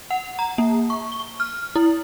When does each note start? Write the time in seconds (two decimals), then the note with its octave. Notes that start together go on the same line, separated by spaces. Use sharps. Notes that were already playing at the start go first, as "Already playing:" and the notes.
0.11 F#5
0.39 A#5
0.58 A#3
0.90 C#6
1.12 G7
1.40 F6
1.76 E4